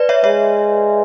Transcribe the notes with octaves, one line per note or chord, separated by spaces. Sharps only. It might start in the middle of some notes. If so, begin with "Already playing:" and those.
Already playing: B4 D5
C#5 E5
G#3 C#5 E5